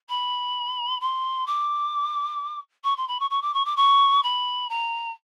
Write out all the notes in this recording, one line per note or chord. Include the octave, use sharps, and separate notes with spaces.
B5
C6
D6
C#6
C6
B5
C#6
C#6
D6
C#6
D6
C#6
B5
A#5